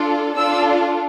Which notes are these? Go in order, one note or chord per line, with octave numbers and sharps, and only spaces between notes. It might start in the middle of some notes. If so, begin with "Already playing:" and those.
Already playing: D4 F4 A4
D4 F4 A4 E6